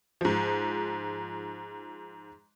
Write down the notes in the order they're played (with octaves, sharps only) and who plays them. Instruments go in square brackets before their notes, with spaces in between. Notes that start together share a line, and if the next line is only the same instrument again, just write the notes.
[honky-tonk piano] G#2 F3